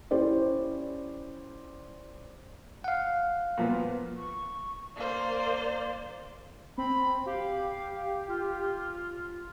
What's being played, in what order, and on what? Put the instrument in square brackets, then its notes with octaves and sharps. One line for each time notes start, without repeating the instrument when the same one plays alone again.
[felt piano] C#4 E4 G4 C5 D5
[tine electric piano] F5 F#5
[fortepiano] A#2 F3 B3
[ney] C#6
[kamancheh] A#3 C5 [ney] D5
[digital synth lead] C4 [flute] B5
[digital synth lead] G4 [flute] F5
[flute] F4